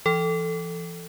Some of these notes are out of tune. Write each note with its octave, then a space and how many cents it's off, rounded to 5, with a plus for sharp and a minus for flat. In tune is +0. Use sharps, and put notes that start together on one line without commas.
E3 +35 A4 +0